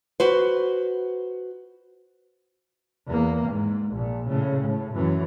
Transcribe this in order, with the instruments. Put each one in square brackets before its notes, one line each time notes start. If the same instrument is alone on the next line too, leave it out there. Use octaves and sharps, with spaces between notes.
[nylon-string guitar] F#4 B4 C5
[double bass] E2 A#3
G#2
A#1 A#2
A2 C#3
A2
F#2 E3